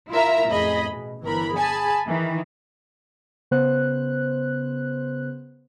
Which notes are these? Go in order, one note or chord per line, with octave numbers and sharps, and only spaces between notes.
E4 F4 A#4 E5 A#5
A1 F2 G#4 D#5 B5
B2
G1 E3 A#4 B5
G#4 G#5 A5 B5
D#3 E3
C#3 B3 C5 F#6